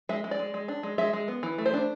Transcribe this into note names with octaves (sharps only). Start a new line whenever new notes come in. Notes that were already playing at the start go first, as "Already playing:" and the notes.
G#3 E5
G#3
D5
G#3
G#3
D4
G#3
G#3 E5
G#3
B3
E3
A3
C5
D4